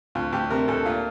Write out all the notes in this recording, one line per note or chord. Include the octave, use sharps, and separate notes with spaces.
D2 F4
D2 G4
C3 A#4
D2 A4
A#2 F4